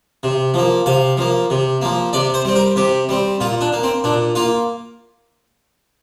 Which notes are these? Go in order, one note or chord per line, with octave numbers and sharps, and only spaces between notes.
C3
F3 A#3
C3 F5
F3 A#3
C3
F3 A#3
C3 D5
C5
G3 C4
A#4
C3 G4
G3 C4
A#2 F4
D4
A#3
C4
A#2 D4
A#3 F4